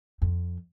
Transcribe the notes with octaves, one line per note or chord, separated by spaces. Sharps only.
F2